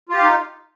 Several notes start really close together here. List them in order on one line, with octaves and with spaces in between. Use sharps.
F4 G4 F5 D#4